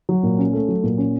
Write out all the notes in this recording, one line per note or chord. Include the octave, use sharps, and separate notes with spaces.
F#3
A#2
C#4
A3
F#3
A#2
C#4